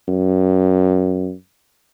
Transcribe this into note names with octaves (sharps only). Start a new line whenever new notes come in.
F#2